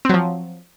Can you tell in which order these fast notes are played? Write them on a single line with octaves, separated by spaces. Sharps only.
C4 F#3 F3